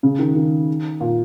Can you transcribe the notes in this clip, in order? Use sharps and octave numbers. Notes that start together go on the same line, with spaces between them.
C#3
D#3
D#3
A#2